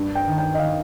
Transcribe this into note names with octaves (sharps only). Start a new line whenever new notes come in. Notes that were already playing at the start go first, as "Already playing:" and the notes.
Already playing: G2
G5
D#3
G5
D#5
D#3 F5